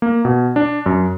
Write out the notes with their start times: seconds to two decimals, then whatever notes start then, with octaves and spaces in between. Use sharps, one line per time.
0.02 A#3
0.25 B2
0.56 D4
0.86 F#2